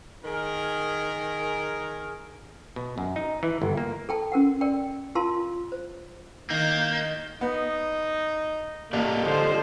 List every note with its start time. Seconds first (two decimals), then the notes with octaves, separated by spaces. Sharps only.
0.25 D#3 G#4 A#4
2.76 B2
2.98 F#2
3.16 D#4
3.43 E3
3.62 G1
3.77 A#3
4.09 A4 G5 A5
4.32 C#4 A#4 F#5
4.61 A#4 D5 G5
5.15 F4 A#4 F5 A5 C6
5.72 C5
6.50 D#3 A#3 G6
7.41 B3 D#4
8.93 A1 A#3 G4 D5 D#5
9.24 D3 F3 C5